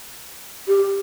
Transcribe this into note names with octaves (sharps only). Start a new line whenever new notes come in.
G4